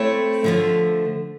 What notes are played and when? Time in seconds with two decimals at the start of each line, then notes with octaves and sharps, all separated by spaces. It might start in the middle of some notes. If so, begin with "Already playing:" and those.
Already playing: A3 C4 E4 A4 C#5
0.44 D3 F3 A3